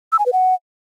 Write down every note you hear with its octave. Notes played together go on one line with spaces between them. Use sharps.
E6
G#5
B4
F#5